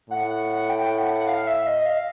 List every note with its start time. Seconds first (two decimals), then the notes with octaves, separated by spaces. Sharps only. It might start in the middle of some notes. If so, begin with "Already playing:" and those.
0.10 A2 F#5
0.30 F#5
0.50 F#5
0.69 G5
0.98 F#5
1.20 F#5
1.27 F5
1.47 E5
1.67 D#5
1.86 F5